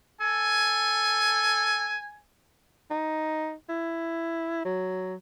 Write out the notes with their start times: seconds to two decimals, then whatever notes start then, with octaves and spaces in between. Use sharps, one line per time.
0.21 A4 G#5
2.91 D#4
3.69 E4
4.65 F#3